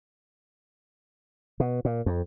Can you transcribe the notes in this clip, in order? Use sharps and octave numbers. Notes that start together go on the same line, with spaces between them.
B2
A#2
F2